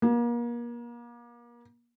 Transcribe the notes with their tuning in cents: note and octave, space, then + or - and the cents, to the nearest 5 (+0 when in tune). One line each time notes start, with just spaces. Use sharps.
A#3 +35